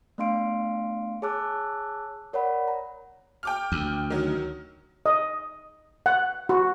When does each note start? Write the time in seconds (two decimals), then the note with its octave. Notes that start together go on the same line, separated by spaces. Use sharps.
0.18 A3 B3 D4 F5 C6 D7
1.22 G#4 C#5 A5 D6 E6 F#6
2.33 A#4 C#5 D5 F#5 B5
2.68 A#5
3.43 G5 D6 F6
3.72 D2
4.10 D#3 F#3
5.06 D#5
6.06 F#5
6.49 F#4